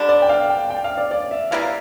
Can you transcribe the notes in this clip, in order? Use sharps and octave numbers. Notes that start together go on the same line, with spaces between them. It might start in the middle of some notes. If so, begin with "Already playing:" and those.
Already playing: D3 G3 D4
D5
G5
F5
G5
G5
F5
D5
D5
E5
E3 G3 A#3 F5